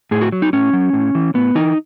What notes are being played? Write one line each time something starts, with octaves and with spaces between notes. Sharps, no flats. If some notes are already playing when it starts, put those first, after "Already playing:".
A2 G#4
F#4
F#3
D#4
A2 C#4
F#3
A2
E3
A2 B3
E3 D#4